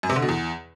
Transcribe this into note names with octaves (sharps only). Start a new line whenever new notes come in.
F#2
C3
D3
B2
E2